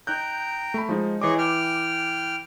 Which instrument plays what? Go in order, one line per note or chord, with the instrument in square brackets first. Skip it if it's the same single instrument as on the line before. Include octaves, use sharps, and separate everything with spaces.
[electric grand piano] D#4 F#6 G6 [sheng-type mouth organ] G5 A#5
[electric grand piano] A3 B5
F3 G#3 D#4
[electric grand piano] E3 D6 [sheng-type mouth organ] G#4 C#5 D#5
[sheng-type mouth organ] G5 F6